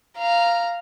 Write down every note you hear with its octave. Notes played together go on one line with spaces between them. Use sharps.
F5 A#5